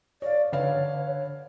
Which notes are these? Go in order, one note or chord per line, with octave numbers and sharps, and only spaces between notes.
C#5 D5 F5
D3 B4 C#5 F5